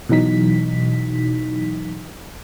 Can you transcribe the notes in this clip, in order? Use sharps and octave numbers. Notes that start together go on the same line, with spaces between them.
B2 E3 F#3 D#4 B6